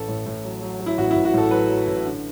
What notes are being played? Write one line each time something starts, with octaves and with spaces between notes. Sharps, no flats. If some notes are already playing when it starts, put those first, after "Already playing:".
Already playing: A1 A4
A2
A2
F#3
F#3
F#3
E4
A1 F#4
E4
A1
F#4
A2 A4
F#3 B4
F#3
A1
D3